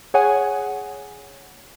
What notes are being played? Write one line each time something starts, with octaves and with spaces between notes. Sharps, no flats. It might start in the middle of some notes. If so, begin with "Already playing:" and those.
G#4 C#5 F#5 G#5